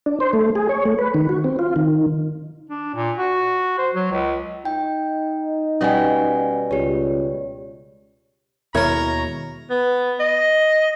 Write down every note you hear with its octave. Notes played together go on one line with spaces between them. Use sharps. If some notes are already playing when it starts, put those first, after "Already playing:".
D4
C5
A3
G#4
C#5
A3
B4
D#3
F#4
C4
F4
D#3
D4
A#2
F#4
C5
F#3
C#2
D#4 G5
B2 G3 C#4 F#5 G#5
C#2 G4 C#5
D#2 B2 G#3 E4 A#4 C#5 A#5
B3
D#5